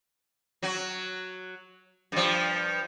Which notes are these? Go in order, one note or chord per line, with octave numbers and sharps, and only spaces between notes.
F#3 F#4
G2 F3